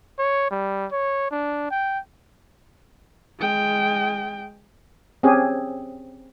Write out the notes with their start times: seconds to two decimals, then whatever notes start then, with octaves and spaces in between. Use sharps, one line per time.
0.19 C#5
0.51 G3
0.92 C#5
1.31 D4
1.71 G5
3.39 G#3 G5
5.23 C4 C#4 G4 G#4